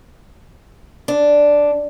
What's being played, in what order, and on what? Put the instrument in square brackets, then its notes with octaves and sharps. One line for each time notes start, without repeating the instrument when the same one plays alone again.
[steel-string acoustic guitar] D4